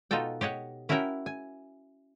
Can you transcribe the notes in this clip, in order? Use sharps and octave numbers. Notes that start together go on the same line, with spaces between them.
B2 D#4 F4 F#4 A4 G5
G4 C#5 D#5 F#5
C#4 E4 F#4 A#4 F#5 G5
G#5